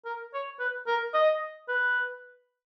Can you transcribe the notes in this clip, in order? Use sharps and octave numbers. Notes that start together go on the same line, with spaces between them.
A#4
C#5
B4
A#4
D#5
B4